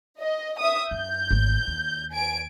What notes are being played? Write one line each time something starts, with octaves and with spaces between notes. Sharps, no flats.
D#5
E5 D#6
F#2 G6
G#1 A3
D#2
G#5 D7